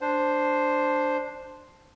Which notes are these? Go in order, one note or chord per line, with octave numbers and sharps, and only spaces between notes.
D4 C5